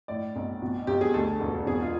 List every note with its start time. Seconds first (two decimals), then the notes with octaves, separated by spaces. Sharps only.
0.08 A2 D5
0.36 B1
0.62 B2
0.87 B1 G4
1.01 G#4
1.14 D2 A4
1.40 E1
1.66 B2 G#4
1.82 F4